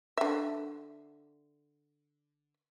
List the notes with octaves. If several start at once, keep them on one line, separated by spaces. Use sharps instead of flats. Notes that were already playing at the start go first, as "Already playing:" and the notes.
D3 E5